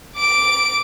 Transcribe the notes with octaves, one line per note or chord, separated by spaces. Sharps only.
D6 D7